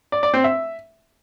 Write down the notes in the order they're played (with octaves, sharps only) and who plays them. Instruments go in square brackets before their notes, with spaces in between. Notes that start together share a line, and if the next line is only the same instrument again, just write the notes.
[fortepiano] D5
D5
C4
E5